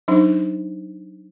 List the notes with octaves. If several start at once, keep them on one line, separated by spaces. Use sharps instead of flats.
F#3 D4 D#4 C5